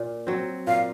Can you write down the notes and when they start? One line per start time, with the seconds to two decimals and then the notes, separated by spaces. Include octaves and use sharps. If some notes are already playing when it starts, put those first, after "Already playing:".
Already playing: A#2
0.27 F#3 C4
0.67 A#2 F5